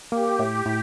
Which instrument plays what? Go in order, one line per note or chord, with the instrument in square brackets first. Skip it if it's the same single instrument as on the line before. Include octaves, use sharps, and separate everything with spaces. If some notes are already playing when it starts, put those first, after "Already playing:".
[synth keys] A#3 [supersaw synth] G4
[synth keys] A2
A2